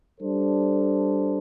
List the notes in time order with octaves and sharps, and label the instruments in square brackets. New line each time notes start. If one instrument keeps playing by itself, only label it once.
[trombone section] G3 D4 A4 C5